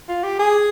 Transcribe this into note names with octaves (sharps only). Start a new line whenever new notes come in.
F4
G4
G#4